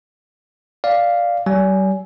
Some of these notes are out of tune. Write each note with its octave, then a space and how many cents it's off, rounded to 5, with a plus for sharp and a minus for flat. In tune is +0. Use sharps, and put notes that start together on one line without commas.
D5 +0 F5 +0
G3 -40 G#5 +0